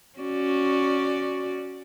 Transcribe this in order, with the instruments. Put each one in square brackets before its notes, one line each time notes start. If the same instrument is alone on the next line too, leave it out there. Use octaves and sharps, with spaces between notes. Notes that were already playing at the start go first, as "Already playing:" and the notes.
[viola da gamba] C#4 F#4 D5